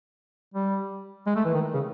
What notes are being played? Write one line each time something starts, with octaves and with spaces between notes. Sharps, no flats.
G3
G#3
A3
E3
D#3
C#3